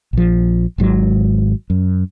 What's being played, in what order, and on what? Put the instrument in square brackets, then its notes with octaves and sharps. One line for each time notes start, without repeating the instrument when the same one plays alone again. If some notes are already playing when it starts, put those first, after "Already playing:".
[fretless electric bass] A#1 F3
G#1 G#2 F#3
F#2